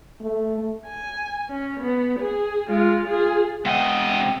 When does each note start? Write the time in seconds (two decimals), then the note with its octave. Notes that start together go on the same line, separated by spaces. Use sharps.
0.21 A3
0.86 G#5
1.49 C#4
1.80 B3
2.20 G#4
2.68 G#3 F4
3.07 F4 G#4
3.65 C3 G#3 D#5 F#5 G5